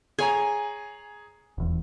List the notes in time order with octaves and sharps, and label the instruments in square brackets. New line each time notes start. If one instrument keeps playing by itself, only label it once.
[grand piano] G#4 C#5 A#5 [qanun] G#5
[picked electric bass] D#1 E2